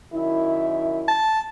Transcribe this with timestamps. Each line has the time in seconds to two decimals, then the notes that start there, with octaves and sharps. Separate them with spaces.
0.13 F#2 D#3 E4
1.08 A5